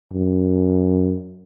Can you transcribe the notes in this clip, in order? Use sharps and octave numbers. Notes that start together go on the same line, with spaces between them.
F#2